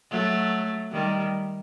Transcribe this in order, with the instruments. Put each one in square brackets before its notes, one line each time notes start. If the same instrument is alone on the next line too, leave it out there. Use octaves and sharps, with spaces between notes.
[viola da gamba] F#3 A3
D#3 G3